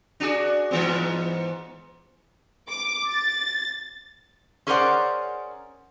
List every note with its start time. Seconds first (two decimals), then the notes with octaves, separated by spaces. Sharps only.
0.20 D4 F#4 G#4
0.71 G#2 E3 B3
2.69 D6
3.09 A6
4.67 C#4 G#4 A#4 C5 D5 F#5